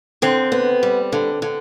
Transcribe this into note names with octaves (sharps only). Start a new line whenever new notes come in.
D3 C4
B3
G3
D3
D3